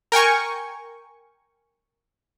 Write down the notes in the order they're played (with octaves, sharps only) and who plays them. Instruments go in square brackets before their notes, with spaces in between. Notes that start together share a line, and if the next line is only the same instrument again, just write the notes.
[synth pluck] A#4 G5 G#5 C#6